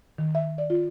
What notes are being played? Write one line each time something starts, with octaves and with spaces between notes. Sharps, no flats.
D#3
E5
D5
F4